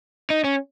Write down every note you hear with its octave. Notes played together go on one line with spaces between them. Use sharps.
D#4
C#4